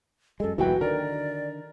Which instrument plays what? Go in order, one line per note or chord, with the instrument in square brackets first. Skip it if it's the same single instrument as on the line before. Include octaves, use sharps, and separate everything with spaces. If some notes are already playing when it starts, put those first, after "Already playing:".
[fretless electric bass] F#2 G#3 [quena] A4
[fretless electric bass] D2 A#2 E3 [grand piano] F#3 F#4 G5 [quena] B4
[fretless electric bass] D3 D#3 [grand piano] A#4 [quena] D5